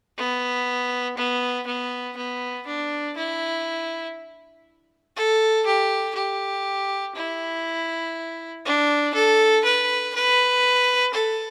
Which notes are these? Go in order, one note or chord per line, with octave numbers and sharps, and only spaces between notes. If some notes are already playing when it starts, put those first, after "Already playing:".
B3
B3
B3
B3
D4
E4
A4
G4
G4
E4
D4
A4
B4
B4
A4